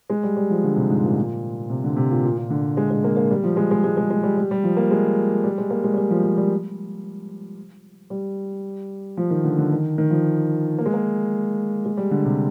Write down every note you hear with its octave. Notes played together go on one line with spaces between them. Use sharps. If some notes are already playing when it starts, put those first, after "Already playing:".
G#3
G3
G3
F3
D3
C3
G#2
A#2
C3
D3
C3
A#2
A#2
A#2
D3
G#3
G#3
A#3
A#3
G3
F3
G#3
G#3
G#3
G#3
G#3
G3
G3
G3
F3
A#3
G#3
G3
G#3
A#3
G#3
G3
G#3
F3
F3
G3
G3
F3
D#3
D3
D3
D#3
D#3
F3
A#3
G#3
A#3
G#3
G3
D3
C3